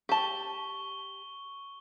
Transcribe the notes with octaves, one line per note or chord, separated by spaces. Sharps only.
G4 A5 C#6 G7